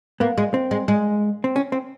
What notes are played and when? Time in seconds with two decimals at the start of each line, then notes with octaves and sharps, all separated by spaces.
0.20 A#3 B3
0.38 G#3
0.54 C4
0.71 G#3
0.88 G#3
1.44 C4
1.56 C#4
1.72 C4